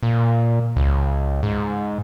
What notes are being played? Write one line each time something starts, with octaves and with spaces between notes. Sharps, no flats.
A#2
C#2
G#2